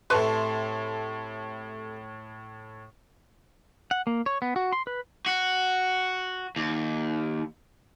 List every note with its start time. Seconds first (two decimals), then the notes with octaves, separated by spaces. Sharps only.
0.10 A2 C3 A3 B4 A5 C6 C#6
3.91 F#5
4.07 A#3
4.26 C#5
4.42 B3
4.56 F#4
4.73 C6
4.87 B4
5.26 F#4
6.56 D#2